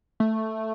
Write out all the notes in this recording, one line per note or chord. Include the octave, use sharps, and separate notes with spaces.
A3